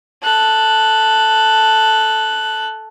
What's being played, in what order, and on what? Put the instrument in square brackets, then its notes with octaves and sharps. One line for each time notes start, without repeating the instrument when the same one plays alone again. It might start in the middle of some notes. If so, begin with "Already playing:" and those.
[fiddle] A4 F#6